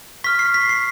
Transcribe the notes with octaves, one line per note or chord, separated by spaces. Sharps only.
C#6 F6 B6
C7
B6
C7